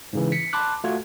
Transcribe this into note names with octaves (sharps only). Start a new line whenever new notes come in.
G#2 C#3 E3
B6 C#7
A5 B5 C6 D6 F#6
A3 F4 F#4 G#6